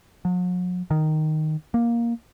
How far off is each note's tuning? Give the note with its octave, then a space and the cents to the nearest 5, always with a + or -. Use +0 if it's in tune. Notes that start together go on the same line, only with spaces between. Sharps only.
F#3 -45
D#3 -5
A#3 +10